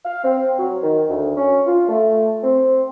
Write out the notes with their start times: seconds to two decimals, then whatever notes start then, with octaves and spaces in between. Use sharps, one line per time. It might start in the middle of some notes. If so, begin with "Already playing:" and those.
0.05 F5
0.24 C4
0.59 F#3
0.83 D#3
1.09 D2
1.37 C#4
1.67 F4
1.89 A3
2.44 C4